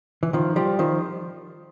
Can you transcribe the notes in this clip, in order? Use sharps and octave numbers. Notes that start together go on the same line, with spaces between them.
E3
D#3 F3
F3 G3
D#3 F3